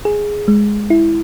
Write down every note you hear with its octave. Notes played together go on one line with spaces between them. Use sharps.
G#4
G#3
E4